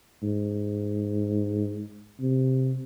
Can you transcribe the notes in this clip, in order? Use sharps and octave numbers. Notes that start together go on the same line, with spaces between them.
G#2
C3